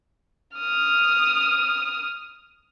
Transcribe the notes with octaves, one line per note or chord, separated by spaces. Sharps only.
D#6 F6